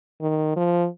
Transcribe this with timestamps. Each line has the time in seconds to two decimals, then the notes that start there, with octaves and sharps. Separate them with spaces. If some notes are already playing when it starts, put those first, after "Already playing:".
0.22 D#3
0.56 F3